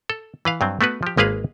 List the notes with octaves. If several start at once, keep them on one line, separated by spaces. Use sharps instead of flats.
A4
E3 B4 F5
G2 F#3 C4
A3 B3 F#4 B4
F3 G4
G#1 G#3 A#3 G#4 B4 F5